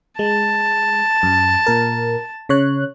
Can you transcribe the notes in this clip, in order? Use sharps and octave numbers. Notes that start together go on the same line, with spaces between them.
G#3 A5
F#2
A#2 A#4
C#3 C#5 F#6